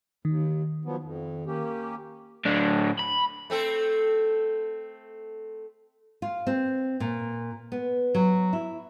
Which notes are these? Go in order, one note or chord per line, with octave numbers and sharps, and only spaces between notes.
D#2 D#3
F3 F#3 B3
F2
A#3 C#4 G4
A2 D4
B5
A3 C4 A4
F4
C4
A#2
B3
F#3
E4